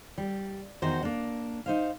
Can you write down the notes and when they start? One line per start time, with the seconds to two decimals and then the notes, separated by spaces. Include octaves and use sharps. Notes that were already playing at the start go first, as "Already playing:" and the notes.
0.18 G3
0.82 E2 D#3 D#4 F#4 C5
1.03 A#3 D4
1.66 D#4 C5 F5